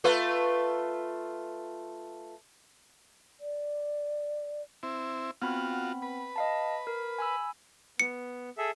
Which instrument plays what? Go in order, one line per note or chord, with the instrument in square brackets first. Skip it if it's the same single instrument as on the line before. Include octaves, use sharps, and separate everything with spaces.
[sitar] A3 F4 B4
[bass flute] D5
[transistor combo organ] C4 E4
[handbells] B3 C4 B5 [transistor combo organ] F4 F#4
[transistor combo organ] B4
[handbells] D#5 F5 A5
A#4
G#5 B5 E6
[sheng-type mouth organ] B3 [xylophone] C#7
[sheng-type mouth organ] G#4 A4 E5